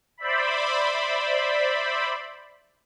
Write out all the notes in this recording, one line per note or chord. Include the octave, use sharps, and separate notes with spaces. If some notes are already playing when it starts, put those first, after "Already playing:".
C5 D5 E5 B5